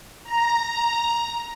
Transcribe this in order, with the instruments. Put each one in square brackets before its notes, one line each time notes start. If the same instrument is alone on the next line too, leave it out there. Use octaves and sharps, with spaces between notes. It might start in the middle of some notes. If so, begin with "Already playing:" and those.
[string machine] A#5